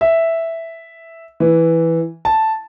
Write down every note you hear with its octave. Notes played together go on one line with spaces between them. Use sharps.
E5
E3
A5